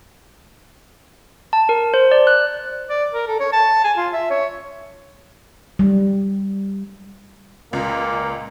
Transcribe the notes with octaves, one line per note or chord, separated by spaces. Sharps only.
A5
A#4
C5
D5
F#6
D5
A#4
A4
C#5
A5
G#5
F4
E5
C#5
G3
C#2 A#2 A#3